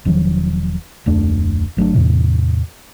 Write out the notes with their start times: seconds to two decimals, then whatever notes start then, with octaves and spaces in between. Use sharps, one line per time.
0.05 E1 D#3 F3 F#3
1.06 D1 F2 A3 D4
1.77 G1 F#3 A3 D4
1.94 E2 A2 C3